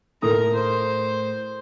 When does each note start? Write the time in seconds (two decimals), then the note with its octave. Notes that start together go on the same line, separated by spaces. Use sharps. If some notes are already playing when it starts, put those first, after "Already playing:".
0.22 A2 A3 A#4 A#5 D#6
0.54 C5